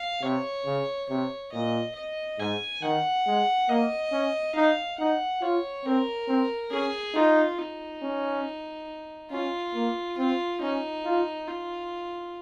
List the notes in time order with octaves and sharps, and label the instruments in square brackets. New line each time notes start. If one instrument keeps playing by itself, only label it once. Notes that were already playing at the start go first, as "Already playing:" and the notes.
Already playing: [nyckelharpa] F5
[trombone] C3 [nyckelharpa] C#5
[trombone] C#3
[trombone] C3 [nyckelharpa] C#5
[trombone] A#2 [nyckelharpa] D#5
[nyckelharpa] D#5
[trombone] G#2 [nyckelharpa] G#5
[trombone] D#3 [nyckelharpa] F#5
[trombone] G#3
[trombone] A#3 [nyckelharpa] D#5
[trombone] C#4
[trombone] D#4 [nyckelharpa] F5
[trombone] D#4 [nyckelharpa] F#5
[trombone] F4 [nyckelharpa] C#5
[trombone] C4 [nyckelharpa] A#4
[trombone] C4
[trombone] C#4 [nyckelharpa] G#4
[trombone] D#4 [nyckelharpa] F4
[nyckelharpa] D#4
[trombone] C#4
[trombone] C#4 [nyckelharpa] F4
[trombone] A#3
[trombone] C4 [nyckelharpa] F4
[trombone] C#4 [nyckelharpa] D#4
[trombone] F4
[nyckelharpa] F4